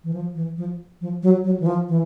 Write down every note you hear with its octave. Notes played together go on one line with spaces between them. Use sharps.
E3
F3
E3
F3
F3
F#3
F#3
E3
F3
E3